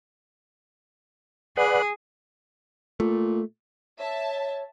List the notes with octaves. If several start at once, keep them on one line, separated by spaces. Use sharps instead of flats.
G#4 B4 D5 F#5
A#2 A3
C#5 E5 A5